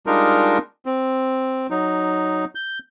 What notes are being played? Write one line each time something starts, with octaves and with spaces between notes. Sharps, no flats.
G3 G#3 D4 D#4 F4 A#4
C4
F#3 D#4
G6